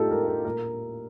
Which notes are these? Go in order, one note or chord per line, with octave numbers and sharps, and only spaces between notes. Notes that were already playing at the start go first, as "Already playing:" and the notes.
Already playing: A2 D#4 F4 G4 A4
A#4
A4
A#2 A#4